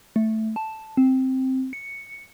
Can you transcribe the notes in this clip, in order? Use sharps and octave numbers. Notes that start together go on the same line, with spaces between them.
A3
A5
C4
C#7